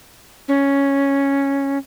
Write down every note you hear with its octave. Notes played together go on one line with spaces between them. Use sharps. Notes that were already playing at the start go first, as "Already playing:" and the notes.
C#4